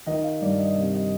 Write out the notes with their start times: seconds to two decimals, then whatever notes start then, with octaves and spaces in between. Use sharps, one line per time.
0.07 D#3 D#5
0.24 F5
0.41 G2 D5
0.59 D#5
0.76 C3
0.93 D#5